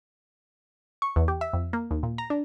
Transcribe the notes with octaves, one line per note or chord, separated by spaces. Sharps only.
C#6
E2
G4
E5
F2
A#3
D#2
A#2
A#5
D4